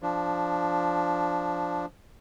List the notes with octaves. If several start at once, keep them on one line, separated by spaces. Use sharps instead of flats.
F3 D4